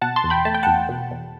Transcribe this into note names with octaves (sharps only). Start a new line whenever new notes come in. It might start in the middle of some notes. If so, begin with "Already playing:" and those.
B2 F#5 A5
A5 C6
E2
G5 B5
A3 A5
G5
E2 F#5 A5
B2
E2